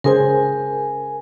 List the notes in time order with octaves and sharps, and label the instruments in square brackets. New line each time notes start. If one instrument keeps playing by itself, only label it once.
[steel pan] C#3 G#4 C5 [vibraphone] A#4 G#5